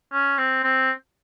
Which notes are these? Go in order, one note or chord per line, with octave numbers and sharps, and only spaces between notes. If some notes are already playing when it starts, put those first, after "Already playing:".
C#4
C4
C4